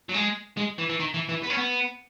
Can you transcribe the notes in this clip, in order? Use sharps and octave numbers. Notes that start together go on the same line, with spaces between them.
F#3
G#3
G#3
E3
E3
D#3
E3
E3
B3
C#4
B3